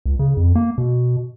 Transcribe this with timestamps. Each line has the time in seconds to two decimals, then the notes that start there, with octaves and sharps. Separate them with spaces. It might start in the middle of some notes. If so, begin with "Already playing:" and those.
0.06 C#2
0.19 C#3
0.37 F2
0.55 A#3
0.78 B2